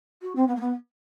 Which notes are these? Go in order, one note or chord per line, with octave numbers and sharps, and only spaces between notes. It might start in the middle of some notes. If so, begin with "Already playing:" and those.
F#4
C4
B3
A#3
B3